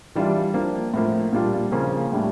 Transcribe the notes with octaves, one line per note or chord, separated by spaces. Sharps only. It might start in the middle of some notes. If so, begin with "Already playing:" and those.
E3 G3 D4 F4
F3 A#3 D4
A2 F3 A#3
A#2 G3 D4 F4
C#3 F3 A#3 C#4 F4
A2 G3 D4